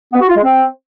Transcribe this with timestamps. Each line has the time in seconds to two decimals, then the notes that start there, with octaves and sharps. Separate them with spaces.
0.13 B3
0.21 F#4
0.28 F4
0.36 G#3
0.44 C4